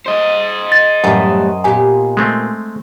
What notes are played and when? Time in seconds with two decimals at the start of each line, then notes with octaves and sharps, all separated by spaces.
0.06 C5 D#5
0.72 A6
1.04 F#2 A2 E3 G3
1.64 A#2 B3 G4 G#5
2.17 G#3 A3 C4